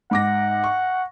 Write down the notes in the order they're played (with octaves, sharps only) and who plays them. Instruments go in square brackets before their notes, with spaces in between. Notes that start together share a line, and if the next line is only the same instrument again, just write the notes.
[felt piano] G#2 D6 A#6 [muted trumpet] F#5
[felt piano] C#6